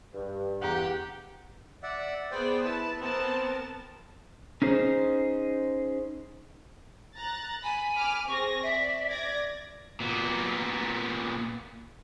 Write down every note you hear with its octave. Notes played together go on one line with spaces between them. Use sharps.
G2
E2 G4 F#5 A#5
D5 E5 F#5
B3 G#4 C5 D5 G5
E4 B4 A5
B3 C4 A#4 A5
C#4 D#4 G#4 C5
A#5 F#6 A6
G#5 B5
B5 D6 F6
C4 G#4 C#6 A#6
D5 E5
D5 D6 G#6 A#6
A#2 B3